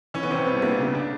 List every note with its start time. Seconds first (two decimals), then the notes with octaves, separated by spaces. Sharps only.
0.14 E3 C#4
0.23 B3
0.30 C3 C4
0.46 G3 B3
0.62 A#3 D4
0.78 C#3
0.94 D4